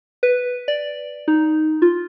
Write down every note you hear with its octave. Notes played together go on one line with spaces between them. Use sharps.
B4
D5
D#4
F4